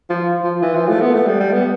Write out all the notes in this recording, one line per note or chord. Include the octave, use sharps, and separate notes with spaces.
F3
F3
E3
F3
A3
B3
A3
G3
G3
B3